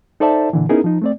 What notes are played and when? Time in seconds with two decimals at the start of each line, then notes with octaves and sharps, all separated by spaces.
0.20 D#4 A4 C5 D5 E5 A5
0.53 A#2 D3 E3
0.69 B3 C#4 D#4 E4 G#4 A#4
0.84 F3 D#4
1.02 A3 C4 D5